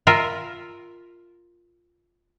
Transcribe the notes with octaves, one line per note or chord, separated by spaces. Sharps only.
F4 A#4 E5